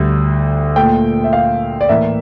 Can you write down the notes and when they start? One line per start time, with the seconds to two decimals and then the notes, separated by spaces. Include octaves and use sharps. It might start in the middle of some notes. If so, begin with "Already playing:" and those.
Already playing: D2 D3 G3
0.76 A#2 A3 G5
1.24 E5
1.33 F5
1.81 D5
1.89 A2 E3 A#3 E5